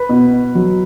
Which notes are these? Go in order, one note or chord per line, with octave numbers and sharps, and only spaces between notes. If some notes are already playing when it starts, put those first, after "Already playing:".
Already playing: B4
B2
F#3